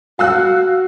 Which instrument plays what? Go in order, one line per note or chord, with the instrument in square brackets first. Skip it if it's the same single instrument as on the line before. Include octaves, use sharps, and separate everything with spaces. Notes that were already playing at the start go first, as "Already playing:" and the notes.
[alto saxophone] F#4 [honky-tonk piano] F5 E6 F#6